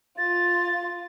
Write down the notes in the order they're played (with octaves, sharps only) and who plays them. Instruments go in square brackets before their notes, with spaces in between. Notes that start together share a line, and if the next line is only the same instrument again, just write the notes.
[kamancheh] F4 [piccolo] A6